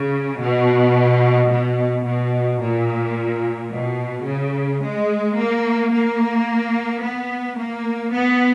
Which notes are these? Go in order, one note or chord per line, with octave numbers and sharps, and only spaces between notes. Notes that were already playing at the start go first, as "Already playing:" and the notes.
Already playing: C#3
B2
B2
B2
A#2
B2
C#3
G#3
A#3
A#3
B3
A#3
B3